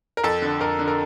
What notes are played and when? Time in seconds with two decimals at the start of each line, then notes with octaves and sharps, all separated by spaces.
0.17 A#4
0.24 F2 A4
0.42 D3
0.60 F2 A#4
0.79 D3
0.88 A#4